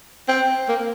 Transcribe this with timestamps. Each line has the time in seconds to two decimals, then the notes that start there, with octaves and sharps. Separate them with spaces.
0.29 C4
0.69 A#3